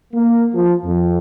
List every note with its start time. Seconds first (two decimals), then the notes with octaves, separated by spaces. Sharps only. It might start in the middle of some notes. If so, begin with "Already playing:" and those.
0.12 A#3
0.53 F3
0.84 F2